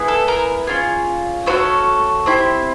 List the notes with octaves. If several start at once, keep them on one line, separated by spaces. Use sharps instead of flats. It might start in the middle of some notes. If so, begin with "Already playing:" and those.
Already playing: B3 E4 G#4
A4
A#4
C#4 F4 G#4
A3 C#4 F#4 A4 C5
C4 E4 G4